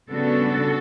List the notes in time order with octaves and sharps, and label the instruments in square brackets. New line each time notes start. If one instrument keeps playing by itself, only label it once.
[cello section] C#3 G3 B3 D4 F#4 A4